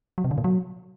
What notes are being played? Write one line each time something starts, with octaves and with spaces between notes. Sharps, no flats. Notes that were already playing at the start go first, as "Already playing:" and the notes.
F#3
C3
D3
A#2
F#3